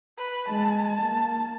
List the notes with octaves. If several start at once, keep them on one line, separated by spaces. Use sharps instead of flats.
B4
G#3 A5
A#3